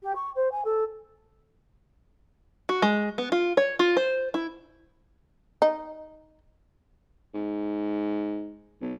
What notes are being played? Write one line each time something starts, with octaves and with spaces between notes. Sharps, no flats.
G4
C#6
C5
G#5
A4
F#4
G#3
B3
F4
C#5
F4
C5
E4
D#4
G#2
B1